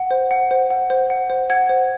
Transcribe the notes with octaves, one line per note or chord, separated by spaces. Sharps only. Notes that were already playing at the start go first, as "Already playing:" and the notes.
Already playing: F#5
C5
F#5
C5
F#5
C5
F#5
C5
F#5 G#6
C5